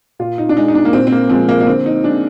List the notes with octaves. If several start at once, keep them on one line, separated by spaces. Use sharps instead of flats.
A#2 F4
D#4
D4
G#3 D#4
D#4
D4
A#3
A#2 C4
C4
A#3
F3 G#3 C4
A#3
A#3
D3 C4
D#4
G#3 D4